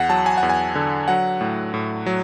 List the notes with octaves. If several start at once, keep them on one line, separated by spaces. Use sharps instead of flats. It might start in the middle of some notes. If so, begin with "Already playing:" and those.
Already playing: E2 F#5
F#3 A5
G#5
F#5
E2
G#5
D3
F#3 F#5
A2
A2
F#3